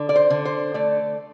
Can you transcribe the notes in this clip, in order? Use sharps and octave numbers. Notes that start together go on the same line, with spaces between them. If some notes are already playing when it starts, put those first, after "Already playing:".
Already playing: D3
D5
C5
D3
C5
A3 D5